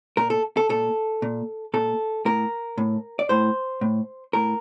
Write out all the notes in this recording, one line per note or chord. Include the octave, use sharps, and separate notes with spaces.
A#2 A#4
A4
A4
A#2 A4
A#2
A#2 A4
A2 A#4
A2
D5
A2 C5
A2
A2 A#4